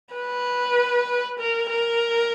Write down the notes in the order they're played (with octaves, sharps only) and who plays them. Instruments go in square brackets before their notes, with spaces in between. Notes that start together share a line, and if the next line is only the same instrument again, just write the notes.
[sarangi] B4
A#4
A#4